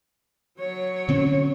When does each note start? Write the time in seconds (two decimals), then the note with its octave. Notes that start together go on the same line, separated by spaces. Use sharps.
0.59 F#3 C#5
1.09 D3 C4 C#4